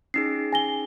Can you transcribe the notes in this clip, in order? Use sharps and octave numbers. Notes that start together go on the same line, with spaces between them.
C#4 D#4 G#4 C7
G#5 A#6 G7